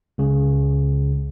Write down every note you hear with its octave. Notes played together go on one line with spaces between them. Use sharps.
C#2 C#3